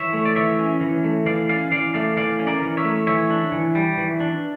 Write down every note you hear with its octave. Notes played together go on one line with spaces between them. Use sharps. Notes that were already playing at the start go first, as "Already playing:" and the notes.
Already playing: E3 C#5 E5
A3
D5
E3 C#5 E5
C#4
E3
A3
E3 D5 F5
C#4 D5 F5
E3 D5 F5
A3 D5 F5
E3 D5 F5
C#4
A#4 D5
E3
C#5 E5
A3
E3 C#5 E5
D4
E3
G3
E3
D4